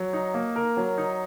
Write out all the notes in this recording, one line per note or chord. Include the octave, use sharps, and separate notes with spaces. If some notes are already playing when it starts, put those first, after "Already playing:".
Already playing: F#3
D#4
A#3
A#4
F#3
D#4